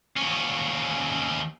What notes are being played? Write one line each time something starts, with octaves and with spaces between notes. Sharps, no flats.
D#2 C#4